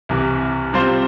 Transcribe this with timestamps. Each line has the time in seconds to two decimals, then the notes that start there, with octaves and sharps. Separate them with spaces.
0.09 C2 C3 E3
0.73 C3 G3 C4 F4 C5